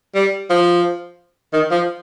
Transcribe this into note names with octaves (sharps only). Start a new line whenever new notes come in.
G3
F3
D#3
F3